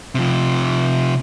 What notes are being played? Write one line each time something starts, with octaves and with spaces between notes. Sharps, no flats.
C3 F3